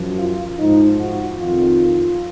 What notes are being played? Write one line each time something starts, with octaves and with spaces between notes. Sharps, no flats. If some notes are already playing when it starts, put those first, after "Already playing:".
Already playing: F#2 F3
F4
G#2 F3 D#4
F#4
F2 D#3 F4